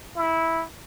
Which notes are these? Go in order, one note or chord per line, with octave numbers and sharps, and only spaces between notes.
E4